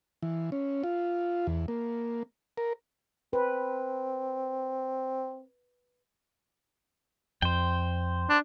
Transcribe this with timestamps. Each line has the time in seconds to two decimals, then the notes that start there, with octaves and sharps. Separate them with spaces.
0.22 E3
0.52 C#4
0.83 F4
1.47 E2
1.68 A#3
2.57 A#4
3.33 C4 B4
7.42 F2 C5 G5
8.29 D4